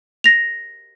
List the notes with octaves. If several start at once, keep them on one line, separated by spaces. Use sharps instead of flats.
A#6 F7